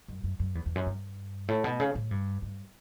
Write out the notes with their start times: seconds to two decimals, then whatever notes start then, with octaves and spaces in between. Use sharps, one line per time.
0.08 F#2
0.24 F#2
0.39 F#2
0.55 E2
0.66 E2
0.75 F#2
0.86 G2
1.48 A2
1.64 B2
1.80 C#3
1.95 A2
2.11 G2
2.42 G2